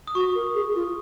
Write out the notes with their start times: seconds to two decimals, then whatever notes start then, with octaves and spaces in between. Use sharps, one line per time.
0.07 D#6
0.15 F#4 C#6
0.35 A#4
0.55 G#4
0.75 F4